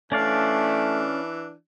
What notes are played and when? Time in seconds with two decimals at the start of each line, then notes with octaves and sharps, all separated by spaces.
0.12 E3 A3 C#4 D4 D5 F5